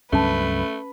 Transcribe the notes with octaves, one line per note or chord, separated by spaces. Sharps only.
C#2 G2 F#3 A3 C#4 B4 A5